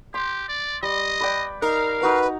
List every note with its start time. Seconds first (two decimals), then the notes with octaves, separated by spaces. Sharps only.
0.14 G4 C6
0.49 D5
0.83 G3 D#5
1.21 B4 D5 G5
1.62 D#4 A#4 F5
2.01 D#4 F#4 B4 A#5